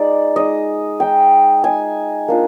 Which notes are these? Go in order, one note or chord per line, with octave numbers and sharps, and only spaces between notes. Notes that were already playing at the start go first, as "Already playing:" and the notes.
Already playing: G#3 D#4 D5
G#3 D#4 D#5
G#3 D#4 G5
G#3 D#4 G#5
A#3 D4 F4